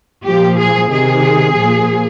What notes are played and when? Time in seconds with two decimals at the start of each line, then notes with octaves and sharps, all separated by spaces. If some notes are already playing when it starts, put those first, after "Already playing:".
0.24 A#2 F3 G4
0.58 G#4
0.90 C3 D#3 G#4
1.55 A#2 F3